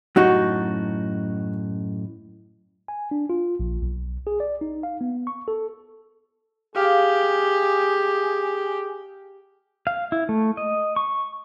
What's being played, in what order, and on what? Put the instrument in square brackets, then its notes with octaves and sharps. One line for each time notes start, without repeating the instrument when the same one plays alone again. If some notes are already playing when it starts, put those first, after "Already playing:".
[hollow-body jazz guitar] F#2 A2 D#4 [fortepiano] F#4
[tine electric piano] G#5
D4
F4
A#1
B1
G#4
D5
D#4
F5
B3
C#6
A4
[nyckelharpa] G4 [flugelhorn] G#4 [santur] F5
[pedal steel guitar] F5
E4
A3
D#5
C#6